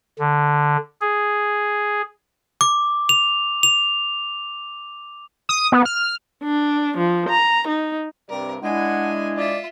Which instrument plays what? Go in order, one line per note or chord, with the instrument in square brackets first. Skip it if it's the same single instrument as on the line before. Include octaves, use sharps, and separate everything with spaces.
[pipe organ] D3
G#4
[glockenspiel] D6
F7
F7
[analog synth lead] D#6
B3
F6
[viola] D4
F3
A#5
D#4
[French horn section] G2 C3 [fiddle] A#4 [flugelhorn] D5
[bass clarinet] G#3 [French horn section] D4 E4 [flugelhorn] F#5 [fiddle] G#5
[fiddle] F4 E5 [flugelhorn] D5